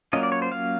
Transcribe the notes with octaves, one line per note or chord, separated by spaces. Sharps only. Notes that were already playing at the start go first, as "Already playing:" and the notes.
F#3 A#3 C#4 F4 D#5
D5
C#5
C5
F5